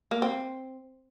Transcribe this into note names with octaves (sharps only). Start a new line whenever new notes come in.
A#3
C4